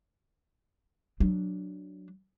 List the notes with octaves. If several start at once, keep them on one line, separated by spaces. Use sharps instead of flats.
F#3 D4